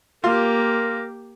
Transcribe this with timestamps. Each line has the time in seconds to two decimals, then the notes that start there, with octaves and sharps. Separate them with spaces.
0.24 A#3 F4 G4 A#4